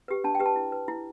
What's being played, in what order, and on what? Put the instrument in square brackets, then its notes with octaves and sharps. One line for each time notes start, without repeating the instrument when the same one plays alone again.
[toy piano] G4 B4
D4 A5
G5
G4 B4
A5
E4
B4
E4